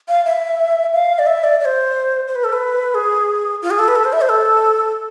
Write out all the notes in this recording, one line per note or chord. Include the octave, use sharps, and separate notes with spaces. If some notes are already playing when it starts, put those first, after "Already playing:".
F5
E5
F5
D5
E5
D5
D5
C5
C5
B4
A4
B4
G#4
F4
G#4
A4
B4
A4
C5
E5
C5
A4